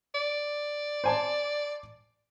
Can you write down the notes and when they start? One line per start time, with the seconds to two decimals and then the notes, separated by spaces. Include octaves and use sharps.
0.15 D5
1.04 C5 G#5 A5